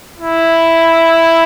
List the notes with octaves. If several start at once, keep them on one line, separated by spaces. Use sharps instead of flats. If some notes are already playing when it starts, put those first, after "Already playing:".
E4